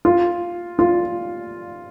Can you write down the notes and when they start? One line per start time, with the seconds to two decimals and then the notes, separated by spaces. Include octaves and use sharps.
0.05 F4
0.79 F4